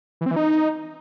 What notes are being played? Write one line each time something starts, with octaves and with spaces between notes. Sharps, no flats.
E3
C4
E3
D#4